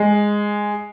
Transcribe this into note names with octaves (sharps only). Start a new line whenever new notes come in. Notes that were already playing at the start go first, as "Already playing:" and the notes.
Already playing: G#3